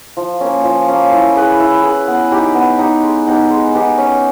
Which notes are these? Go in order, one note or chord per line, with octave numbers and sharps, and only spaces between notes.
F3
A#3 C#4
F3
A#3 C#4
E4
G#4 B4
E4
G#4 B4
B3
D#4 G4
B3
D#4 G4
G#3
B3 D#4 G4
G#3
B3 D#4 G4
C#4